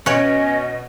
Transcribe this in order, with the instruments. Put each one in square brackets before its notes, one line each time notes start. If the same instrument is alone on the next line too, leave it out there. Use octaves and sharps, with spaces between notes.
[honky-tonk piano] B2 D7 [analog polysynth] C#4 [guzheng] C#5 F#5 [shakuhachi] D#5